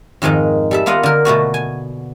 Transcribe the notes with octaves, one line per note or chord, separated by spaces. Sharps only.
F2 G#2 D#3 G#3 D#4
G3 A4 E5
A#3 B3 F4 D#5 F#5
D3 A#4
B2 A3 B3 F#4
G#5